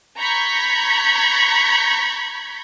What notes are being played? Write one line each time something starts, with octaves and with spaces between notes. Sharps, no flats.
A#5 B5 C#6 G6 G#6 B6